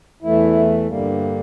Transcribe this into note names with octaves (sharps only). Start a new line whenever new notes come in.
E2 E3 A3 E4
G2 D3 G3 A#3